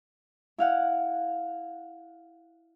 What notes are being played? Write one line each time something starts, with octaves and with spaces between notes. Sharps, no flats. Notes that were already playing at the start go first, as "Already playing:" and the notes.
E4 F5 F#5